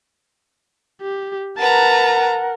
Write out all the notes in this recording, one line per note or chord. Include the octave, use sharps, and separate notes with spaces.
G4
A#4 B4 F#5 A5 A#5